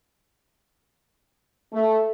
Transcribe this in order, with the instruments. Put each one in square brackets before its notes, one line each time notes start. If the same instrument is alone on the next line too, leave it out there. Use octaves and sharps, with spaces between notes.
[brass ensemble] A3